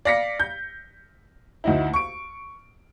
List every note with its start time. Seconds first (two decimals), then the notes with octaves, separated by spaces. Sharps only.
0.05 D5 F5 A#6 B6 C#7
0.40 G6
1.64 D2 D#4 E4
1.94 C#6 D7